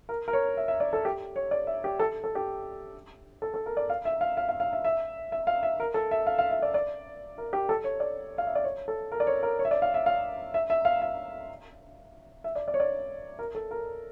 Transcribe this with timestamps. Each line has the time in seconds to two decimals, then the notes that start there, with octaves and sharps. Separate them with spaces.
0.09 A#4
0.28 A#4
0.33 C#5
0.57 E5
0.68 E5
0.80 D5
0.93 A4
1.05 G4
1.36 C#5
1.51 D5
1.67 E5
1.84 G4
1.99 A4
2.24 A4
2.35 G4
3.42 A4
3.54 A4
3.66 A#4
3.77 D5
3.90 F5
4.05 E5
4.21 F5
4.37 F5
4.49 F5
4.60 F5
4.73 E5
4.85 E5
5.32 E5
5.47 F5
5.63 E5
5.80 A#4
5.94 A4
6.11 E5
6.27 F5
6.39 F5
6.51 E5
6.62 D5
6.74 D5
7.38 A#4
7.53 G4
7.69 A4
7.84 C#5
8.00 D5
8.38 F5
8.47 E5
8.55 D5
8.64 C#5
8.88 A4
9.12 A#4
9.20 D5
9.27 C#5
9.43 A#4
9.59 C#5
9.65 E5
9.71 D5
9.82 F5
9.94 E5
10.06 F5
10.54 E5
10.70 E5
10.85 F5
11.02 E5
12.44 E5
12.55 D5
12.68 D5
12.74 C#5
12.80 D5
13.39 A#4
13.55 A4
13.71 A#4